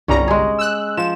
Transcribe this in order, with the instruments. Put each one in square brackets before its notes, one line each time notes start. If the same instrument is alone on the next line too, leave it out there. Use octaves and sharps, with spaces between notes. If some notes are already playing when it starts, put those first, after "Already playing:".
[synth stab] G1 C2 A#5 [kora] G3 C#4
[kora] G#3 G#4
[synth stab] E6 F#6
[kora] F3 [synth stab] E7